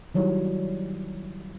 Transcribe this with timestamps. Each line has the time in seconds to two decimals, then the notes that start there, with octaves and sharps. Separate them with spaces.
0.15 D#3 F#3 G3 E4 C#5